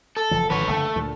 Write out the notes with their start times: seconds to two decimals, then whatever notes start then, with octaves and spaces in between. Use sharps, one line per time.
0.17 A4
0.31 F1 E3 F3
0.50 G#1 D3 F3 B4 C#5
0.68 F#1 D3 A3
0.96 D2 A#2